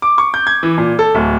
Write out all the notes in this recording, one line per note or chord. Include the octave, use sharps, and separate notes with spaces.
D6
C#6
G6
G#6
E3
A#2
A4
D1